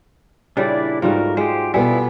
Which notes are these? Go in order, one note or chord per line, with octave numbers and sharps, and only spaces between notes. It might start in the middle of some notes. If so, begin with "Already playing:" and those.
A#2 C#3 G3 D4 E4 D5
G#2 G3 A3 F4 F#4 A#4
G#3 G4 C5
B2 G3 B3 E4 F4 A4 G#5